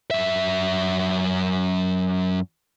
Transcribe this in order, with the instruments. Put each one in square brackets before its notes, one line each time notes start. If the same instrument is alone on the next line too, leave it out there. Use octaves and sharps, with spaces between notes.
[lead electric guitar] F#2 E5